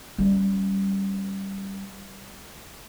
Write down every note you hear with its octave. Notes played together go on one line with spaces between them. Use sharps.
G3 C#4